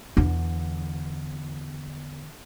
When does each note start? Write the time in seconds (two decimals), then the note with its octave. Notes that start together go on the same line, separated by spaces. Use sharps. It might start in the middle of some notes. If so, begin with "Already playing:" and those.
0.17 E2 D3